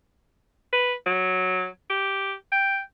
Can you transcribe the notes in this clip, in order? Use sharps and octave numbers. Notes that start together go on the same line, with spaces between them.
B4
F#3
G4
G5